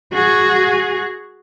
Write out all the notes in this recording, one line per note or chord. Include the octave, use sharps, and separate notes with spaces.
F#4 G#4